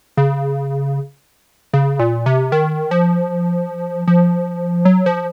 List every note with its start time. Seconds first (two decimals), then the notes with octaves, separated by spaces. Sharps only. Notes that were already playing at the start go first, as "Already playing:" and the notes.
0.17 C#3
1.73 C#3
1.99 A#2
2.26 C3
2.52 D#3
2.91 F3
4.08 F3
4.85 F#3
5.06 F3